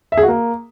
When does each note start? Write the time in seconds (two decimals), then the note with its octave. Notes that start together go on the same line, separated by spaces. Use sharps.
0.12 E5
0.17 G#4
0.23 F#4
0.28 A#3